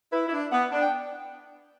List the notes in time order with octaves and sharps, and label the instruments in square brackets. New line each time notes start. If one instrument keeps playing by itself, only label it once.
[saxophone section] E4 [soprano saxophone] B4
[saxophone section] E4
D4
[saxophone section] B3 [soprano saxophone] F#5
[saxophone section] D4
[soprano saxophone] G5